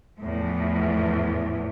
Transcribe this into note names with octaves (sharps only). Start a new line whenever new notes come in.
E2 A2 F3